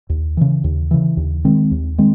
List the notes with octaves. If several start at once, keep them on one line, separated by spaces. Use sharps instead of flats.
D#2
C#3 E3
D#2
C#3 E3
D#2
D#3 G#3 C4
D#2
D#3 G#3 C4